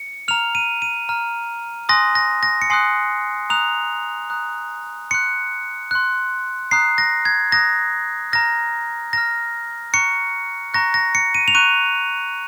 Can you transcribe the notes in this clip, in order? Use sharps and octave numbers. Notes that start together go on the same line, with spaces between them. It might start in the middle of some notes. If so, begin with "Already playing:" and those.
Already playing: C#7
A#5 F6 F7
D#7
D#7
A#5 F6
G#5 C6 D#6 F#6 A#6
A#6
A#6
C#7
G#5 C6 D#6 F#6 C7
A#5 D#6 F#6 F7
A#5 D#6 F#6
C6 F#6 C#7
C6 F#6
A#5 D#6 F#6 C7
A#6
G#6
A#5 D#6 F#6 A#6
A#5 F6 A#6
A#5 F6 A#6
A#5 C#6 F#6 C#7
A#5 C#6 F#6 A#6
A#6
C#7
D#7
F7
A#5 C#6 F#6 D#7